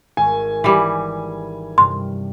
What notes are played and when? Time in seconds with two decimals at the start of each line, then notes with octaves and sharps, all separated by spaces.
0.17 G#1 G#5 C#6
0.64 E3 G3
1.78 G2 C3 C6